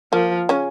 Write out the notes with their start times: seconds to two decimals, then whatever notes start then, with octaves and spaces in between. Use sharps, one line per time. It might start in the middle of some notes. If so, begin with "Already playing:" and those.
0.12 F3 A#3
0.49 C#3 C#4